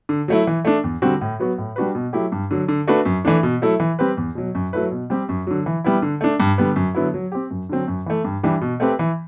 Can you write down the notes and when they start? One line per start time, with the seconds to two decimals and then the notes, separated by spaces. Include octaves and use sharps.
0.09 D3
0.28 F#3 A3 E4
0.47 E3
0.65 A3 D4
0.84 E2
1.02 D3 G3 C4 F#4
1.21 A2
1.40 F#3 B3 F#4
1.58 A2
1.76 G3 D4 F#4 B4
1.95 B2
2.13 F#3 A3 E4 G4
2.32 G2
2.51 D3 F#3
2.68 D3
2.88 A3 D4 F#4 B4
3.05 F#2
3.25 E3 A3 D4
3.43 B2
3.62 F#3 A3 E4 A4
3.80 E3
3.99 G3 C4 G4 B4
4.17 E2
4.35 B2 F#3
4.55 F#2
4.73 F#3 A3 E4 B4
4.92 B2
5.10 G3 C4 G4
5.29 F#2
5.47 D3 F#3
5.66 E3
5.84 G3 B3 E4
6.02 D3
6.21 A3 D4
6.40 G2
6.58 D3 G3 B3
6.76 F#2
6.95 D3 F#3 B3 E4
7.14 F#3
7.32 C4 G4
7.51 F#2
7.69 D3 F#3 C4
7.88 F#2
8.06 E3 A3
8.24 G2
8.43 E3 G3 D4 G4
8.61 B2
8.80 A3 C4 G4 B4
8.99 E3